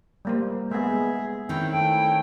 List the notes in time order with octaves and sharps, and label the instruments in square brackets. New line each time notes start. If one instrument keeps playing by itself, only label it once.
[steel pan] G3 A#3 C5
[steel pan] G#3 B3 [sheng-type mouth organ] G#4 E5
[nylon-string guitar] D#3 C4 C#4 [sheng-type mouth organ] E4 G5
[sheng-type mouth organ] A3 E4 [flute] G5